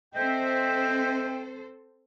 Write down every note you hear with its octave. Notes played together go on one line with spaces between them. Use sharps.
C4 A4 C5 D#5 E5 G5